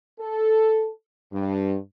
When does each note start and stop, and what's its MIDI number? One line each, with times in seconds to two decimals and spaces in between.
0.20 0.89 69
1.33 1.76 43